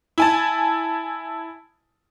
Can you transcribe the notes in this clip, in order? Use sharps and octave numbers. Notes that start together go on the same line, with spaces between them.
E4 G#5 A5